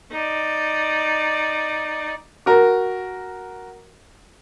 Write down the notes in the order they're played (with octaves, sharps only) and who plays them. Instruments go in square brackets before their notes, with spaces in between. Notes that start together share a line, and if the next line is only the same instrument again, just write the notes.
[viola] D#4 D5
[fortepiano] F#4 A#4